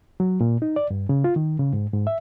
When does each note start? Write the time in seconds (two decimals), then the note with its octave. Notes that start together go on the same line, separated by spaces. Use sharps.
0.20 F#3
0.41 A#2
0.62 D#4
0.76 D5
0.91 G2
1.09 C#3
1.24 F4
1.36 D#3
1.59 C#3
1.73 G#2
1.93 G#2
2.07 E5